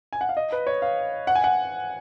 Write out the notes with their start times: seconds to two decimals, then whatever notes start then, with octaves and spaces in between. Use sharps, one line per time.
0.13 G#5
0.21 F#5
0.29 F5
0.37 D#5
0.52 B4
0.67 C#5
0.82 F5
1.27 F#5
1.35 G#5
1.44 F#5